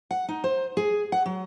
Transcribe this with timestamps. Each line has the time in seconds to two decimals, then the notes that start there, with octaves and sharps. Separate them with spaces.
0.11 F#5
0.29 D#4
0.44 C5
0.77 G#4
1.12 F#5
1.26 F#3